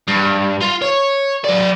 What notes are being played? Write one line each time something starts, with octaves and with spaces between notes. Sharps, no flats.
G2
F4
C#5
F#3 D5